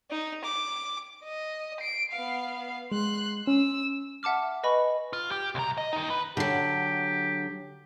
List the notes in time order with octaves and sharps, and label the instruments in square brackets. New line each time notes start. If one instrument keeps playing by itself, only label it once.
[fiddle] D#4
D6
[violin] D#5
[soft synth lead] C7 [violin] D7
[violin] B3 F5
[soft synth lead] G#3 [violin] C6 F#6
[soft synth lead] C#4 [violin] E6
[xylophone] E5 F#5 A5 D6 F6
B4 D#5 G#5 B5 C#6
[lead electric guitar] F4
G4
C2 A#5
D#5
D#2 D#4
B4
[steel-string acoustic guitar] D3 F#3 [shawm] G4